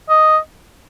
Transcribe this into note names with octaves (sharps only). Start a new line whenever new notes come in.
D#5